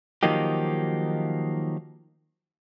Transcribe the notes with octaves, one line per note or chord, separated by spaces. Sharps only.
D#3 F3 F#3 A#3 D#4 G4